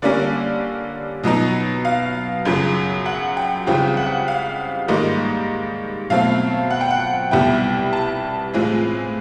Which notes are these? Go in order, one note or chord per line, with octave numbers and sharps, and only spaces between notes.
D3 G3 A#3 C#4 D5
B2 F#3 B3 D#4 D#5
F5
F#2 C#3 F#3
F#5
G5
C#2 C#3 E3 G3 C4 G5
F#5
F5
G#2 D#3 G3 A#3 D#5
B2 F#3 A3 C4 F5
F#5
G5
F#5
C2 B2 G3 B3 E4 G5
A5
A2 E3 G#3 C4 F4